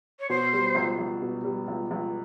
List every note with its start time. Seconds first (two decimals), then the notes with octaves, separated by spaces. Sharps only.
0.20 C#5
0.29 B2 C5
0.53 G3
0.75 C#2
0.98 C#2
1.22 B2
1.44 G3
1.68 C#2
1.91 C#2